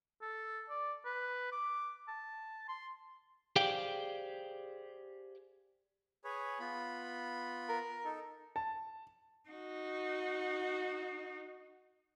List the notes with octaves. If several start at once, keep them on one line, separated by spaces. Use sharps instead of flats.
A4
D5
B4
D6
A5
C6
G4 G#4 C5 D5 F5 G5
G#4 B4 C#5
B3 F4 B5
A#4
D#4 A4
A5
D#4 F#4